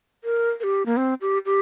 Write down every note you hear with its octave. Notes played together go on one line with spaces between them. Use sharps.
A#4
A#4
G4
A#3
C4
G4
G4